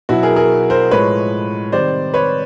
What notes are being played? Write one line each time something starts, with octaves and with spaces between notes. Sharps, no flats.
B2 F#3 E4 F#4
G#4 A#4
G#4 A#4
A#4 C5
A2 F3 G#3 B4 C#5
C3 D#3 G3 C5 D5
B4 C#5